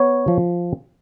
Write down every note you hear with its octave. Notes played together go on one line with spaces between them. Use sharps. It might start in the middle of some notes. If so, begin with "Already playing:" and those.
Already playing: B3 C#5
F3